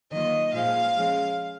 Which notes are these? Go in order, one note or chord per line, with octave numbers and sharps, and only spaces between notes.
D#3 F#3 A#3 F4 D#5
A#2 F3 G#3 F5
F3 G#3 C#4